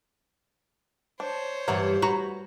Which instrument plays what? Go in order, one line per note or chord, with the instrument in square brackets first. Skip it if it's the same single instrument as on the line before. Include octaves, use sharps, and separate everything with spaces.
[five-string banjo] D4 [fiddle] C5 C#5
[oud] G2 E3 [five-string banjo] F#3 A#3 B3
[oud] F#4 [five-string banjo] B4 A#5 B5